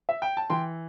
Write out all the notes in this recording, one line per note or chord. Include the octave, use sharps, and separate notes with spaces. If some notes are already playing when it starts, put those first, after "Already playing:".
E5
G5
A5
E3 G5 C6